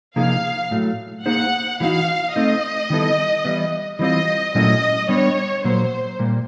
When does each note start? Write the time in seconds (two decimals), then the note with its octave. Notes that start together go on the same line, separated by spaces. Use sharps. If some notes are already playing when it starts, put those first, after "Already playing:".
0.16 C3 F3 A#3 D#4 G#4 F5
0.71 A2 F#3 A3
1.26 A#3 D#4 G#4 C5 F#5
1.80 E3 G3 B3 D#4 F#4 F5
2.35 A3 C4 D#4 D#5
2.90 D#3 G3 B3 E4 A4
3.45 E3 G3 B3 E4
3.99 E3 G3 C4 F4 D#5
4.55 A#2 F#3 A3 C#4 E4 D#5
5.09 G3 B3 D4 C#5
5.64 A#2 F#3 A#3 C5
6.19 A#2 G3 A#3